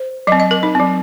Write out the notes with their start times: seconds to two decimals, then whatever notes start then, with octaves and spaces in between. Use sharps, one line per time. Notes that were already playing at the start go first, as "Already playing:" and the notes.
Already playing: C5
0.27 F#3 D#5
0.32 C4
0.40 D#5
0.51 A#4
0.63 D#4
0.75 F#3 C4